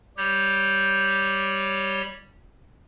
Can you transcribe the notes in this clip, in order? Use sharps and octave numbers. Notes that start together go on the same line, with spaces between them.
G3 G4 C#5 G6